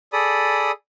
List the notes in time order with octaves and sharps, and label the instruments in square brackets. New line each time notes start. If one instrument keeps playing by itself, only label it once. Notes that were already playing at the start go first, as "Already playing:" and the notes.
[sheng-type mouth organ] G#4 A4 D5 B5 D#6